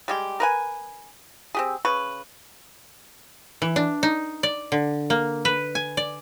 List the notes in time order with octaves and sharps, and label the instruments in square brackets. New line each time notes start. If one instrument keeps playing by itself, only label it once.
[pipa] G3 G#3 G4
A#4 B4 G#5
C4 G4 G#4
C#3 B4 C#6
[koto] E3
D4
D#4
D5
D3
A#3
B4
G#5
D5